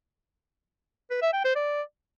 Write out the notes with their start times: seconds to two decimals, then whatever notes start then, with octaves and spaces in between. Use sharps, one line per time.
1.10 B4
1.22 E5
1.33 G5
1.44 C5
1.55 D5